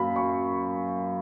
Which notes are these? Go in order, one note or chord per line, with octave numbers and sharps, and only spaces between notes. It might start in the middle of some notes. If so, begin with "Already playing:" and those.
Already playing: F#2 A#3 F5 B5
C#6